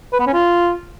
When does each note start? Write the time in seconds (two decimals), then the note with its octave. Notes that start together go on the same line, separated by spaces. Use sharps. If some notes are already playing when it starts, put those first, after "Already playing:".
0.13 B4
0.20 B3
0.27 C#4
0.34 F4